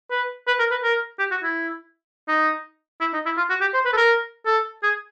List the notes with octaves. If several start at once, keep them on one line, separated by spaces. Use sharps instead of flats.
B4
B4
A#4
B4
A#4
G4
F#4
E4
D#4
E4
D#4
E4
F4
F#4
G4
C5
B4
A4
A#4
A4
G#4